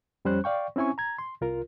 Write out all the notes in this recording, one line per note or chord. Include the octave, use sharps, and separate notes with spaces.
F2 G3 C#4 C5 F#6
D5 F5 G5 C#6
C4 C#4 E4 G#5 C#6
A#5 G#6
C6
C2 F4 A#4